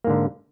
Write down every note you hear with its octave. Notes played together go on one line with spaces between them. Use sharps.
G#2 D3 A#3